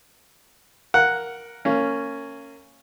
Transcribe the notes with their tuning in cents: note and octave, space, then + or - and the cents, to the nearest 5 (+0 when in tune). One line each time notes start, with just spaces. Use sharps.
A#4 +5 F#5 +0
A#3 -25 C#4 +0